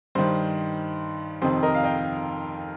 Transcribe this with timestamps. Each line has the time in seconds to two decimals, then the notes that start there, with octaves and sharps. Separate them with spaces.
0.15 G2 D#3 C5
1.42 F2 C3 D#3 C5
1.63 A#4 D#5
1.74 F5
1.84 D#5 G5